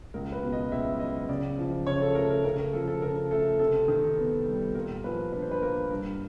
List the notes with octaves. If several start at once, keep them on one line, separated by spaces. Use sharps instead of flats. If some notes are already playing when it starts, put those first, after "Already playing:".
C#2 A#4
B4
B2
D#5
C#2 E5
F#3 D#5
C#3 D5
F3
C#3 C#5
A4
A3 A#4
A#4
C#3 A#4
A#4
F3 A4
A4
C#3 A#4
A3 A4
C3 A4
D#3
B3
G3
A#2 A#4
F3 B4
D4 B4
C5
B4
A#3 A#4
G2 A#4